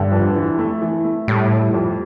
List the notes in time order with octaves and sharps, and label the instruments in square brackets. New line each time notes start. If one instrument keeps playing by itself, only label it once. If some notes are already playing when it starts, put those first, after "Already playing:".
Already playing: [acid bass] G2 [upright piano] D3
[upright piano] F2
E3
A3
E3
A3
[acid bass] A2 [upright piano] G3
[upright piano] G3
F2